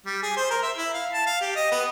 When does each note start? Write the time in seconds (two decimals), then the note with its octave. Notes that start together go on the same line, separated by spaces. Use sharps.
0.06 G3
0.23 G#4
0.36 C5
0.50 A#4
0.63 E5
0.77 E4
0.94 F5
1.13 A5
1.26 F5
1.41 G4
1.56 D#5
1.71 B3